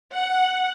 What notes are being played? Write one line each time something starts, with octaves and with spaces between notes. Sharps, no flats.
F#5